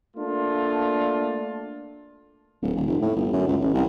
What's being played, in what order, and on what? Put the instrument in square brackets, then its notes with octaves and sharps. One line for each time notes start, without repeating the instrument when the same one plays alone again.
[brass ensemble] A3 A#3 D4 F4
[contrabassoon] D1
D#1
F1
A2
G1
F#2
C#2
A1
C2